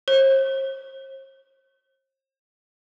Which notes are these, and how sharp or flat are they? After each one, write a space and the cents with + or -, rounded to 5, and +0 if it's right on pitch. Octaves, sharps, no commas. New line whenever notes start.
C5 +45